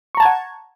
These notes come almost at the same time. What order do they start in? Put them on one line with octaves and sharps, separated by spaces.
C#6 A#5 A5 G#6 F#5